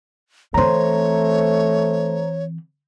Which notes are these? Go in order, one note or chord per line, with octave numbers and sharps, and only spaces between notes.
E3 A3 C4 C5 C#5 A#5